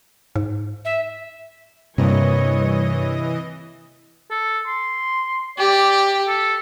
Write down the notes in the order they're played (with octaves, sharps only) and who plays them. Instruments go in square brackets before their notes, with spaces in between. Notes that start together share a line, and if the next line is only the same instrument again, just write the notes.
[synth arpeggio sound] G#2
[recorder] E5
[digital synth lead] G2 [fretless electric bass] C3 A#3 [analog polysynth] E3 D#5 [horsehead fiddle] C#5
[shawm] A4
C6
[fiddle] G4 [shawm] D5
[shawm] A4